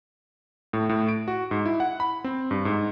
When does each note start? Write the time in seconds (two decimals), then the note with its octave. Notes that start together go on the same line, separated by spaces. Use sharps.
0.73 A2
0.89 A2
1.09 D7
1.28 F#4
1.51 G#2
1.66 E4
1.80 F#5
2.00 B5
2.24 C4
2.51 G2
2.65 G#2